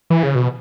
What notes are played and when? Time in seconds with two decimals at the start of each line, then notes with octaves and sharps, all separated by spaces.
0.10 E3
0.23 C#3
0.35 B2